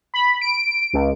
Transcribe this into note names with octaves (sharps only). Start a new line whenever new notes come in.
B5
D7
C#2